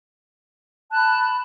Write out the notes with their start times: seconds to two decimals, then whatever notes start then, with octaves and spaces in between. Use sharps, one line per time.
0.90 A5
0.93 F#6
0.96 B5